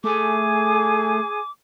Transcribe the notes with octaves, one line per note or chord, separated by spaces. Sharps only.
A3 G#4 G#5 D6